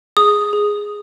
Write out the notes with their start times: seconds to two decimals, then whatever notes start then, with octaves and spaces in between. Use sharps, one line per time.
0.17 G#4 D#6
0.53 G#4